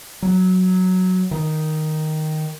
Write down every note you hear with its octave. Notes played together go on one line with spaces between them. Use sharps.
F#3
D#3